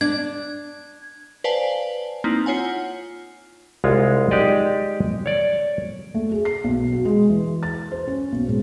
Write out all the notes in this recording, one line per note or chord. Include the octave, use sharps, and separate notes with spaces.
D4 G#6
B4 C5 D5 F5 G#5 A5
A#3 C4 D#4 E4
F4 C#5 F#5 G#5
C2 G#3 F4 C#5
G#3 D#4 G4 D5 D#5
C#5 D5
A3
G#4
C7
B1
F#4
G#3
E3
A6
C5
C#4
B1
G#2